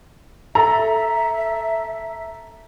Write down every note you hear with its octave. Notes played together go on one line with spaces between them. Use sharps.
A4 E5 A#5